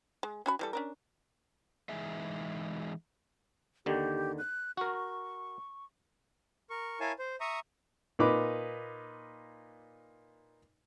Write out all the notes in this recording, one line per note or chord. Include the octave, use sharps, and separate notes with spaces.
G#3
C#4 F#4 B5
E3 G3 A4
C#4 D4 A#4
E3 G#3 D#4 G#4 E5
D#2 D3 D#3 G4
F#6
F#4 A#4 C#6
A#4 C#6
E4 A#4 C#5 F5 G#5 A5
C5
E5 A#5 C#6 D#6
A#2 D#4 B4 D6